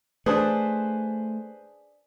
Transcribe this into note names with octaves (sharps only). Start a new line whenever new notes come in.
A3 D4 G#4 B4 C5 A5